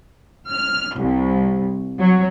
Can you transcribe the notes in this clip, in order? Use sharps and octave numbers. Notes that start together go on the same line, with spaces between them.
F6
C2
F#3